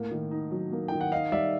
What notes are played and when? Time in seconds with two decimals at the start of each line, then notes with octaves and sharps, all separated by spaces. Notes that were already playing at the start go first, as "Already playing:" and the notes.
Already playing: A2 A#3 F#5
0.11 D#3
0.31 D#4
0.51 F#3
0.72 A#3
0.88 D#3 G5
1.01 F#5
1.11 D#4 D#5 F5
1.32 G3 D5 E5